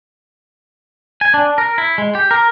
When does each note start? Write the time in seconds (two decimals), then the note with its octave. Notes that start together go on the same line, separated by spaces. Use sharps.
1.21 G#5
1.34 D4
1.58 A#4
1.78 E4
1.98 G#3
2.15 G4
2.31 A#4